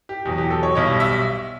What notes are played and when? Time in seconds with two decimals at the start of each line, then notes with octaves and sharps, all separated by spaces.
0.09 G4
0.25 E2 B2 F#3 G4
0.38 G4
0.50 A4
0.63 C#5
0.75 B1 B2 G3 C#5
1.00 E5